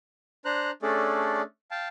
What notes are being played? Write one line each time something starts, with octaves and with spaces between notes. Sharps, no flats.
D4 C5 A#5 F#6
A3 C#4 D4 G#4 A4 D5
F5 G5 A5